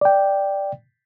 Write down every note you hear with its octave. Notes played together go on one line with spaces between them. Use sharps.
D5 G5